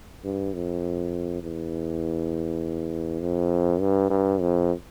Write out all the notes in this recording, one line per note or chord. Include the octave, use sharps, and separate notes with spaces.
G2
F2
E2
F2
G2
G2
F2